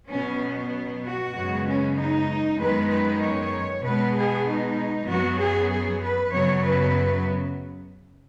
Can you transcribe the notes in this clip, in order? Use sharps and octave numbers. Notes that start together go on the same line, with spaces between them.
B2 F#3 B3 C#4
F#4
F#2 C#3 G#3 B3
C#4
D#4
F#2 D#3 G#3 B3 B4
B4
C#5
B2 G#3 B3 B4
G#4
D#4
F#2 F#3 B3 F#4
G#4
G#4
B4
F#2 C#3 F#3 B3 C#5
B4